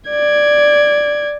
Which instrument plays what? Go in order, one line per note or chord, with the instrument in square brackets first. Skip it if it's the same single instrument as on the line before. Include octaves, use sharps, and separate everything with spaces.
[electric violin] D5 G#6